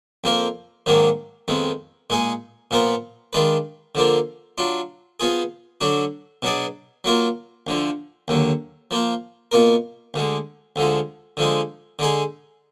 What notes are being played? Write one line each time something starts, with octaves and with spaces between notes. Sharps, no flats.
F2 F3 A#3 F4 A#4
G#2 D#3 F#3 A#3 D4
F2 D#3 G#3 B3
A#2 G#3 D#4 G#4
A#2 F3 B3 F4 A#4
D#3 G#3 D4 F4 B4
D3 F3 A#3 D4 F4
F#3 D4 F4
F3 B3 F4 G#4
D3 F#3 D4 F#4
B2 F#3 D4 G#4 D5
F#3 A#3 F4 A#4
D2 D3 F3
D#2 D3 F#3
F3 A#3 F4
B2 A#3 F4 A#4
D2 D3 G#3
D2 D3 F3 G#3
D3 F3 G#3 D#4
D3 G#3 D#4 G#4